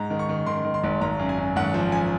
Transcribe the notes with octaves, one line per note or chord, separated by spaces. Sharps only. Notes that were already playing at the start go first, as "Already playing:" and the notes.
Already playing: G#2 A#5
D#3
C#6
D#3
D#3 C6
D#3
C6
G#1
G#1 A#5
F#2
G#5
F#2
G#1 F#5
F3
F3 G#5